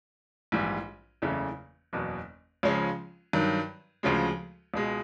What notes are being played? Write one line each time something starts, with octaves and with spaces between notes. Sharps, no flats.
A#1 G#2 E3 G3
F#1 E2 C#3 E3 A3
F#1 E2 B2
C#2 C#3 F3 G#3 C#4
G2 D#3 F#3
D2 C#3 F3 G#3
C#2 B2 G#3